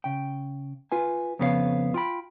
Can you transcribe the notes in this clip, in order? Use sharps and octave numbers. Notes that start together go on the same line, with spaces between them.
C#3 G5
F4 B4 G#5
F2 C#3 B3 F#4 C#5 F5
F4 G5 B5